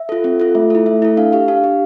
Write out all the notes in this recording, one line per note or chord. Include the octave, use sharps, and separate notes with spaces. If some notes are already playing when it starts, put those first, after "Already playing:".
Already playing: E5
F4 A4
C4
F4 A4
A3 E5
E4 A4
A3 E5
E4 A4
D4 F5
G4 F5
D4 F5
G4